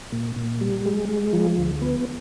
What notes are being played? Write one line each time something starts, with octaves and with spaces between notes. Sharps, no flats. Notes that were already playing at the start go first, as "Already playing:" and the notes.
A#2
A#2
G3
G#3
G#3
F3
D2
B3